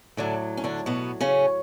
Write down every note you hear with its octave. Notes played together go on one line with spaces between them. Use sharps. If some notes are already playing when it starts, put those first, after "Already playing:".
A2 D3 F#3 D4
C#4
D3 D4
B2 B3
C#3 C#4